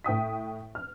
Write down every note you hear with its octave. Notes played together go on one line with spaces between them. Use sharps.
A2 G5 D#6 B6
F6